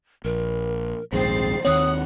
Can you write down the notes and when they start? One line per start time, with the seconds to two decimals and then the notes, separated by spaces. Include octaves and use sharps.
0.25 A#1 A#4
1.13 A#1 D#2 G#2 C4 G#4 A6 C7
1.65 D#2 D#3 C4 C#5 F#5 D#6